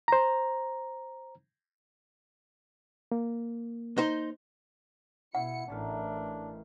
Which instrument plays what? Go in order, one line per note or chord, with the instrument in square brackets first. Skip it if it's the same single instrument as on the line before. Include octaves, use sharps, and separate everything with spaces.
[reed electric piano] C5 A#5
A#3
[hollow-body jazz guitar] D#4 C5
[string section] B2 C#7 [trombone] E4 [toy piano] F#5
[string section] A1 [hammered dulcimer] D#3 E3 F5 [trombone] D4